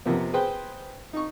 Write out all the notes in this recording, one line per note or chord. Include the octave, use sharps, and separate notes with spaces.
F2 C3 F3 A#3 B3
G#4 B4 C5 G5
D#4 C#6